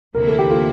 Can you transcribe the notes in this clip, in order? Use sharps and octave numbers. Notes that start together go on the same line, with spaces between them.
D2 C3 E3 A#3 E4 A#4
A4
G4
F4 A4